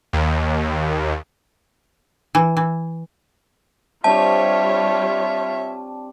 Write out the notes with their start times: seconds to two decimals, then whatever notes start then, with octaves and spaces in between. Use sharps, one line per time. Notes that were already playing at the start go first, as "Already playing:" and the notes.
0.13 D#2
2.35 E3
2.57 E3
4.04 G3 C4 D4 F4 G4 C#5 E5 A5